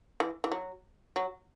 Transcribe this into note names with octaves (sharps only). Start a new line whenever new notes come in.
E3
E3
F#3
F#3